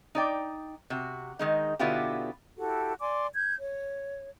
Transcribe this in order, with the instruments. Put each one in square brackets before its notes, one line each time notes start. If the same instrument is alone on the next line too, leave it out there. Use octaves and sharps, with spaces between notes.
[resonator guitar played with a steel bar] D#4 D5 G5
C3 F#4
D#3 G#3 D#4
B2 D3 B3 E4 F4 G4
[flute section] E4 F#4 G4 A4
D5 G#5 C6 D6
G6 G#6
C#5